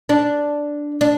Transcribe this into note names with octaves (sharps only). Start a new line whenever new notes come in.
D4
D4